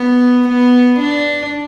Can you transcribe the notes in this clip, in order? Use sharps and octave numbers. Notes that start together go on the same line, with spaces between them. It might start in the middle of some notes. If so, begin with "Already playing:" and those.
Already playing: B3
B3
D4